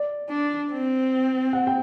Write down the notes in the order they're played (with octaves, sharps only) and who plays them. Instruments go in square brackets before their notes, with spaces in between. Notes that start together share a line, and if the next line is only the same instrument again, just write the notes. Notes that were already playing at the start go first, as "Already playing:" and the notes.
Already playing: [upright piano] D5
[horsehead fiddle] D4
C4
[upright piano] F#5
G5